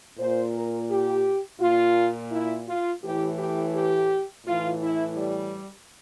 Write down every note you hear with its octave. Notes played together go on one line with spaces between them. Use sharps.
A#2 C5
A#4
G4
A#2 F4
E4
F4
A2 E3 G4
G4
G4
A2 E3 F4
E4
G3